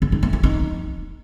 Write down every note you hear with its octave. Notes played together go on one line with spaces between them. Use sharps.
C#4
D#4
A3
E4
D#4